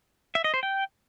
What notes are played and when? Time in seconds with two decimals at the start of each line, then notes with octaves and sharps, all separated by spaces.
0.35 E5
0.44 D#5
0.54 C5
0.63 G5